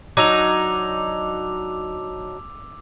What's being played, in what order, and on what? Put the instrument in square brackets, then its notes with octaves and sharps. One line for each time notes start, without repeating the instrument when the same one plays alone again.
[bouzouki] F#3 D4 D#4 [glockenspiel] D6 E6 F7